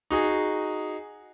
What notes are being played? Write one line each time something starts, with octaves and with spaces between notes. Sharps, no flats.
D#4 F#4 G#4